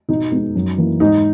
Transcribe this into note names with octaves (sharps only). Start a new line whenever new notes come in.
B2 D#4
G#3 B3
F#2
E3 A#3
G#2 D#4